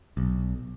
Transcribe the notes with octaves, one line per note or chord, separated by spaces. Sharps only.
B1